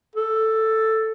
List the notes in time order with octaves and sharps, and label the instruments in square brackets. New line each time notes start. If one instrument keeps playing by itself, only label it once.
[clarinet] A4